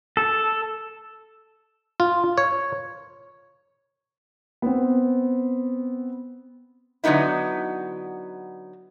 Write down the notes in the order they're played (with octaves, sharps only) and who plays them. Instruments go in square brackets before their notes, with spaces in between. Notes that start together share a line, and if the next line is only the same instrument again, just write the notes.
[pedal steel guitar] A4
[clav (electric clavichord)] F4
C#5
[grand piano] B3 C4
[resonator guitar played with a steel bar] D3 F#3 B3 D#4 E4